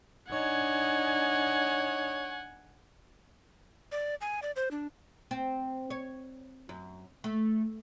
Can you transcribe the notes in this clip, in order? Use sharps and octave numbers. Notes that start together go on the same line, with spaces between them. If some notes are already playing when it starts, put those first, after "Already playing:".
D4 D#4 C#5 F#5 G#5
D5
G#5
D5
C5
D4
C4
C#5
F#2
A3